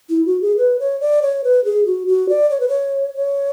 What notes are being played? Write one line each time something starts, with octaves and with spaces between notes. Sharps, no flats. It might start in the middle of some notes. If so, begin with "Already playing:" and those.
E4
F#4
G#4
B4
C#5
D5
C#5
B4
G#4
F#4
F#4
D5
C#5
B4
C#5
C#5